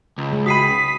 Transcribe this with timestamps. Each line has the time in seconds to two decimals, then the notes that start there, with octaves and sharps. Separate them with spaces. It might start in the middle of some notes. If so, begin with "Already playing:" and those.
0.18 C#2
0.33 G#3
0.46 F#4 G5 B5 D#6 B6 C7 D#7